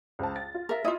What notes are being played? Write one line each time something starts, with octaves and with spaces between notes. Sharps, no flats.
C#2 C5 A5
A6
F4
A#4 E5
E4 F4 D#5 E5 D#6